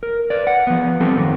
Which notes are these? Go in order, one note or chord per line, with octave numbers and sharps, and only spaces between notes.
A#4
B4 D5
F#5
F3 B3
F3 G3 C4 A4
F#2 D#3 A#3